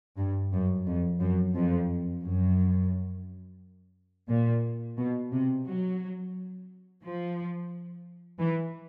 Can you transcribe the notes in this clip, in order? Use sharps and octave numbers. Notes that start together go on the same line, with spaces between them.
G2
F#2
F2
F#2
F2
F#2
A#2
B2
C3
F#3
F3
E3